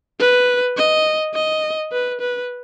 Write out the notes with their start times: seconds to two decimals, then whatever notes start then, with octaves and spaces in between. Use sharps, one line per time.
0.20 B4
0.77 D#5
1.34 D#5
1.92 B4
2.20 B4